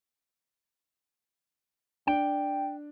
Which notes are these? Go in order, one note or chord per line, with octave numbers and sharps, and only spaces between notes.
D4 D5 G5